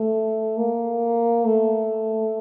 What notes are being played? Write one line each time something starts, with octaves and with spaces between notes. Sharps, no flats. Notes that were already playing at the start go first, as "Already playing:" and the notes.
Already playing: A3
A#3
A3